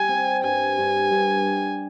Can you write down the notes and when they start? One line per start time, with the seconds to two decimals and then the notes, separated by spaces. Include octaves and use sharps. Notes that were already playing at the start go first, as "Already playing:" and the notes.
Already playing: G3 G#5
0.09 C4
0.43 G2 G#5
0.78 G2
1.11 G2